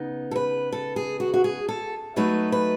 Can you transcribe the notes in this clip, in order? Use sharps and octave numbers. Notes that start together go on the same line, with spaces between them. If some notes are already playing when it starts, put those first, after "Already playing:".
Already playing: C#3 B3 D#4
A4
B4
A4
G#4
F#4
F#4
G#4
A4
F#3 A3 D#4 B4
B4